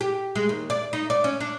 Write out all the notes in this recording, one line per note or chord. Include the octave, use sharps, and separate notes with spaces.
G4
G#3
D#2
D5
D#4
D5
C#4
D4